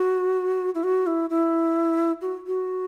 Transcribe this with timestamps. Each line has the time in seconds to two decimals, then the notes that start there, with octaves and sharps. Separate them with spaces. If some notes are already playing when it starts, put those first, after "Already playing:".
Already playing: F#4
0.75 E4
0.83 F#4
1.07 E4
1.30 E4
2.22 F#4
2.47 F#4